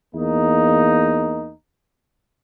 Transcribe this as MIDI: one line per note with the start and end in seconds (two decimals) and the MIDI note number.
0.15 1.52 40
0.15 1.52 58
0.15 1.52 63